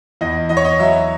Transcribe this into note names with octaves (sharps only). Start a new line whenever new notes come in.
E2 D#5
E2 D#5
C#5
D#5
F#3 E5